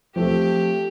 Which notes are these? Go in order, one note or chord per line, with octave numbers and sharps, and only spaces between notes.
F3 A3 C4 G4